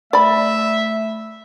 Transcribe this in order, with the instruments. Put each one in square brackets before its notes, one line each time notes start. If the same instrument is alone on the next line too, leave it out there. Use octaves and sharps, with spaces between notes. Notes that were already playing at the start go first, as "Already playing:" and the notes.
[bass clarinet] A3 [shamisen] D5 B5 [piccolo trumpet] E5